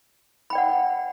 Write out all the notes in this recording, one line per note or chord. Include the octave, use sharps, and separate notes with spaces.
D5 F#5 G5 B5